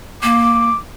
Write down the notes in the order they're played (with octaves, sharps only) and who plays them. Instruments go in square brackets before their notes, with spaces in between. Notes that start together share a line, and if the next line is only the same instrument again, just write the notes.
[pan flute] A#3 [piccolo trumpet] D6